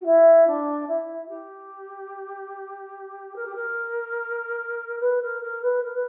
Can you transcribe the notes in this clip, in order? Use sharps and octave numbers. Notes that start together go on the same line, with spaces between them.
F#4
E4
D4
E4
G4
A#4
G4
A#4
B4
A#4
A#4
B4
A#4
B4